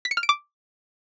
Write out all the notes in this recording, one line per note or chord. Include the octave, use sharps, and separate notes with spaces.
B6
C#7
F6
D7
D6